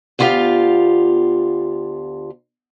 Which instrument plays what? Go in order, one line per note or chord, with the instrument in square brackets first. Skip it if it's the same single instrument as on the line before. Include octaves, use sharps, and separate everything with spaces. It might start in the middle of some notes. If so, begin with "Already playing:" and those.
[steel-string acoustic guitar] D2 B3 F4 G4 F5